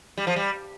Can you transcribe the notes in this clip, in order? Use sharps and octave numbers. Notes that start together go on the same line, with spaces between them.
G3
F3
G3